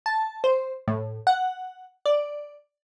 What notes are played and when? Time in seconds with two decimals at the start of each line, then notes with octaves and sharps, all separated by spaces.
0.06 A5
0.44 C5
0.88 A2
1.27 F#5
2.06 D5